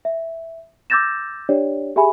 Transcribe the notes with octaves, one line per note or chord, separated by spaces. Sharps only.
E5
D6 E6 G6 A6 A#6 E7
D4 G4 C#5 D5
G4 G#4 E5 G#5 B5